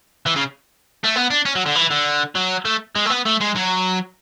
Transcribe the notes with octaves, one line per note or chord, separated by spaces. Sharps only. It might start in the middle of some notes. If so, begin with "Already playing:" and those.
E3
C#3
A3
B3
D4
C#4
F#3
D3
E3
D3
F#3
A3
G#3
A3
B3
A3
G#3
F#3